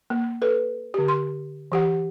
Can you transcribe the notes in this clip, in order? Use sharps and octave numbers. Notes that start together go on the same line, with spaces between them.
A#3
A4 B4
D3 G4
C6
E3 G4 F#5